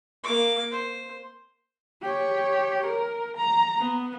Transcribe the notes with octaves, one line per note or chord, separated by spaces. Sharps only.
A#3 D6
C5
G4 C#5
A#4
A#5
B3